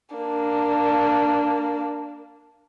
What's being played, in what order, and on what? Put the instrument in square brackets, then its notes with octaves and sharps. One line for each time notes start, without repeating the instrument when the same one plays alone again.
[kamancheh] A#3 D4